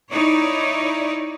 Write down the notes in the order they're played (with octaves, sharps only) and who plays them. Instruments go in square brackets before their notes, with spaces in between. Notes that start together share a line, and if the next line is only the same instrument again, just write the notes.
[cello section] D#4 E4 C#5 D5